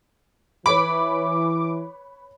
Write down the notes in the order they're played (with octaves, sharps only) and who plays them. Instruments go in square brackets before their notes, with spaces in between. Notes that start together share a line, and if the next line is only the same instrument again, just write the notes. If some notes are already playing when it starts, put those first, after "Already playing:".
[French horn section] E3 [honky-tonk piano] B4 C#5 B5 [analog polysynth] D6